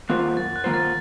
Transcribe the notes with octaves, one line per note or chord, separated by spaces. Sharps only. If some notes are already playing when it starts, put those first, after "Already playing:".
D#3 A#3 F4 C5 F#6
F#2 A6
F#6
D#3 A#3 F4 C5
A6